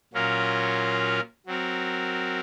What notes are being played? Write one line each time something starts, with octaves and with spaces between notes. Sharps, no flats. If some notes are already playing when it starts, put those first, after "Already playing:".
A#2 F#3 C#4 F4 A#4
F#3 C4 F#4 A#4